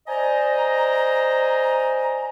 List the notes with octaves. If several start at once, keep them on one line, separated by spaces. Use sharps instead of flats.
C5 D5 D#5 G#5 A#5